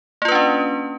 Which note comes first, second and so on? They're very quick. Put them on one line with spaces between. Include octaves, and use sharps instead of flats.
A#3 F4 B4 D4 C#4